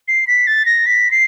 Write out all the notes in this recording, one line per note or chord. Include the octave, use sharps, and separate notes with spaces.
C7
B6
A6
A#6
B6
C7